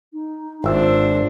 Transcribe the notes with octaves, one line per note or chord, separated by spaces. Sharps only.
D#4
G#1 D4 F4 C5 E5